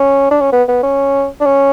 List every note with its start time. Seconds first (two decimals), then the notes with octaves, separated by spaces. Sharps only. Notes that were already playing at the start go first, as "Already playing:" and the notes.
Already playing: C#4
0.31 D4
0.41 C#4
0.52 B3
0.68 B3
0.83 C#4
1.41 D4
1.46 C#4